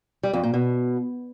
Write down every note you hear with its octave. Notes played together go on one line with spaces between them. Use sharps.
G3
F2
A#2
B2